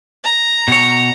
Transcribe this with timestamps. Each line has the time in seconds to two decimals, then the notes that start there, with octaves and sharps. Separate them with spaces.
0.24 A#5
0.68 B2 C#5